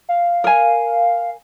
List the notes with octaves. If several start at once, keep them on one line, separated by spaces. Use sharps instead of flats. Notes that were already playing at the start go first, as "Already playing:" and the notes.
F5
A#4 G#5